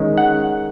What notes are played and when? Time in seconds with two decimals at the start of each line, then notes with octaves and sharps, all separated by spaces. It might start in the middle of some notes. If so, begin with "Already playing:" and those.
Already playing: D#3 G#3 C#4
0.18 F#5